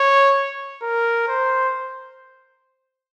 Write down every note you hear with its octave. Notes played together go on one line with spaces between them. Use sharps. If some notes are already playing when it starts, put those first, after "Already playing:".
Already playing: C#5
A#4
C5